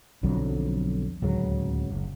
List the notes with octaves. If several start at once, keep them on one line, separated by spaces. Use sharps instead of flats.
B1 F2 D3 F#3
D1 C#2 C#3 F#3
F#1